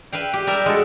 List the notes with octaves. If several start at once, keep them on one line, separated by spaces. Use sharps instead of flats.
B4 E5 F5 G5
G4
G3 A#4 E5
G#3 F#4 A4